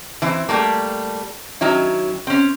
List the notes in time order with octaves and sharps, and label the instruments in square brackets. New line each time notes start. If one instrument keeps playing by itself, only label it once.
[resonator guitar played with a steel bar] E3 C4 E4
G3 A3 A#3
D#3 F#3 C#4 E4
C4 C#4